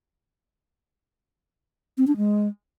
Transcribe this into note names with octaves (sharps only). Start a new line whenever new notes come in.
C4
D4
G#3